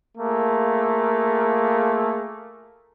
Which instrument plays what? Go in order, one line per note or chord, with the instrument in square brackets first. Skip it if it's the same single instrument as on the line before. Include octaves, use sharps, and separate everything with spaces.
[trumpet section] A3 A#3 F4 G#4